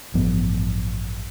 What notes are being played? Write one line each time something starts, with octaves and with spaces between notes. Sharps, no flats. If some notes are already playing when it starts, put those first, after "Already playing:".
A1 G2 F3 B3